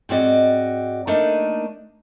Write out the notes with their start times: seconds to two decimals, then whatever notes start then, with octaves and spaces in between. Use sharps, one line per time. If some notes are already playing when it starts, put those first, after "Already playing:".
0.09 G#2 C4 F#4 D5 D#5
1.07 A3 A#3 D4 D#4 A#4